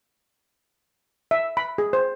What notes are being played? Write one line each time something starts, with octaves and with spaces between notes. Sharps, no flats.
E5
B5
G#4
C5